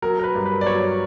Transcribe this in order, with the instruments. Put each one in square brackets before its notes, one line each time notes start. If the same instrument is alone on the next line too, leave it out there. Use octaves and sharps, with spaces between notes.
[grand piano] F#3 A#4
A#4
B4
G2
B4
D5
F#3 C#5